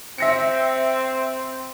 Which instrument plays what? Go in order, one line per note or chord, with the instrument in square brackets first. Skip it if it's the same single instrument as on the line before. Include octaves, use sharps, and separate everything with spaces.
[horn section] C4 [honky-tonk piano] E5 A#6 C#7